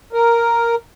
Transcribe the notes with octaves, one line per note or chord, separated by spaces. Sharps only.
A#4